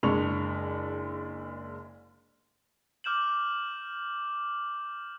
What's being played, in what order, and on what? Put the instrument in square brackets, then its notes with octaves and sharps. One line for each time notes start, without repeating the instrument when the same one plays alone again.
[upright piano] F#1 G#3 D4 C#6 F7
[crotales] D6 F6 G6 E7 F#7